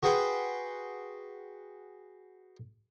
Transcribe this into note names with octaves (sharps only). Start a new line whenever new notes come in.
F#4 G#4 B4 F#5 G5 C6